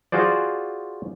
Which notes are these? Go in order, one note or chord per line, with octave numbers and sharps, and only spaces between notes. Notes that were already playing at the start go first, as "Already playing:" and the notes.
F4 F#4 G#4 C5 D5